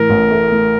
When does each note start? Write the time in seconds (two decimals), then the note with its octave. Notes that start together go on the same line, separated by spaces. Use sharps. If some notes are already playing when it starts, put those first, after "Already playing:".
Already playing: A2 E3 A#4
0.09 A1
0.31 A3
0.52 A2